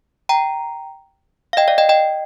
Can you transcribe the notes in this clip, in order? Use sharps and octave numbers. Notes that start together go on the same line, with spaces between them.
G5 A#5
F5
D#5 G5
D5 F5
D#5 G5
D#5 G5